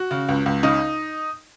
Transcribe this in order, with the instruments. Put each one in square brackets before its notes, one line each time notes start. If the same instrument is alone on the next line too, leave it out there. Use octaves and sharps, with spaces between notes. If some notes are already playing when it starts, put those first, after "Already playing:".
Already playing: [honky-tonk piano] F#4
C#3
C#2
C#2
C#3 D#4